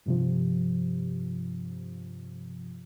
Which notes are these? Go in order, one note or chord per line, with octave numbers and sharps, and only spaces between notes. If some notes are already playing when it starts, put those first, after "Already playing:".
G2 C3 F3